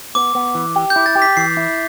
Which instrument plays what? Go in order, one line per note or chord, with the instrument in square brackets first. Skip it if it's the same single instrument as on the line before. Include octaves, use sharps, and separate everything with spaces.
[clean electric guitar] B3 [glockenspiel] D6
[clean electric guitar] B3
E3
G4
[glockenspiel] G6
[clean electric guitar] E4
[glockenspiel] A6
[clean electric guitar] G4
[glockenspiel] B6
[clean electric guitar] E3 [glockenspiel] C7
[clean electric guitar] E4